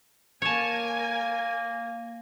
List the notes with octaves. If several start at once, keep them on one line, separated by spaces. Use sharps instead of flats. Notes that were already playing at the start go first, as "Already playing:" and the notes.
A#3 A#4 C#5 G#5 A5